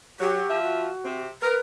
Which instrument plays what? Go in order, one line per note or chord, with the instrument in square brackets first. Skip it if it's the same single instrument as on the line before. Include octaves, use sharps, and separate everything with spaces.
[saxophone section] F#3 [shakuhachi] G4
[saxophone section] F3 F4 E5
[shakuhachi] F#4
[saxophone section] C3 C4
[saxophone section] A#4 [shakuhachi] B4